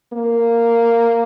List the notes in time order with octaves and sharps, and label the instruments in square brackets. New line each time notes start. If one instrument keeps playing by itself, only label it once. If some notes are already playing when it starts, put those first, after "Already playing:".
[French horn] A#3